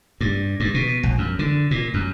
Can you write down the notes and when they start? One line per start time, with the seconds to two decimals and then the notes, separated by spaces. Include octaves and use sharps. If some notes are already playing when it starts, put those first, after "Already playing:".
0.21 G2
0.60 G2
0.74 B2
1.03 A#1
1.18 F#2
1.39 D3
1.71 A#2
1.94 F#2